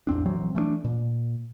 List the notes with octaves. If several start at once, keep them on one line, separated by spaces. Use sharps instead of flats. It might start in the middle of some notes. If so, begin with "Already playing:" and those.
A1 E2 C4 D4
A#1 E3 F#3 C4
E3 A3 A#3 D4
A#2